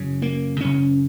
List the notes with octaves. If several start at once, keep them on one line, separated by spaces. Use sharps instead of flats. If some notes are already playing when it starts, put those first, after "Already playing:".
Already playing: F#2 C#3
A#3
F#2 C#3 C#4